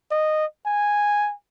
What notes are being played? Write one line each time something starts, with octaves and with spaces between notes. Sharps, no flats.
D#5
G#5